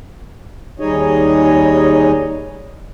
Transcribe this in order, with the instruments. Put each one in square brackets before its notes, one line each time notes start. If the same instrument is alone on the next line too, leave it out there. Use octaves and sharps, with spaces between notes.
[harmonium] D#2 G3 D#4 G#4 C#5 D#5